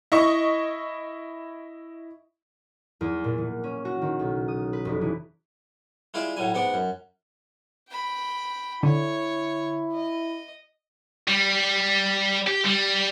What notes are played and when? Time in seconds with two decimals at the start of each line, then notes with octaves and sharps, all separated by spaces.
0.12 E4 D#5 C#6
3.01 E2
3.24 A#2
3.38 E3
3.64 C#4
3.85 F#4
4.02 D#3
4.19 B1
4.48 D#6
4.73 B4
4.85 F1
5.01 E3
6.14 G#3 E4 F4 G4 D5 E5
6.37 A2 F#3 G3 G#5
6.54 G#2 B3 F#5 D6
6.74 F#2
7.90 G5 B5
8.83 D3 E4 C#5
9.93 D#5
11.28 G3
12.47 G4
12.65 G3